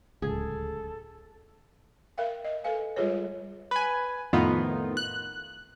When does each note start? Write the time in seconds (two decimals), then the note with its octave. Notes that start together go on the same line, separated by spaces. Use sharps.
0.22 D1 C#2 G#4 A4
2.18 A#4 E5 F5 G5
2.44 D#5
2.64 A4 B4 F5 G#5
2.96 G3 G#3 F4 G#4 B4 C#5
3.71 B4 G#5
4.33 F2 A2 D#3 B3 D#4 F4
4.97 F#6